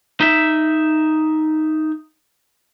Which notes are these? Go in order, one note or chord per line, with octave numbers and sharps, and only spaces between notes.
D#4 E5